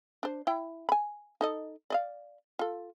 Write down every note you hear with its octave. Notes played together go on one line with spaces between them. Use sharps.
D4 C5
E4 G5
G#5 B5
D#4 A4 D#5
D5 D#5 F5
F4 A4